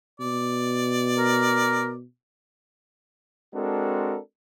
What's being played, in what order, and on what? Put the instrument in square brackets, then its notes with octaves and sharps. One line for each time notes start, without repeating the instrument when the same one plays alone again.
[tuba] B2 [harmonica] D5
[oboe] A#4
[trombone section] G#3 C4 D4 F#4 A4 A#4